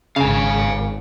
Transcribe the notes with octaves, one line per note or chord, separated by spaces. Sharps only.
G#1 C#3 F5 G#5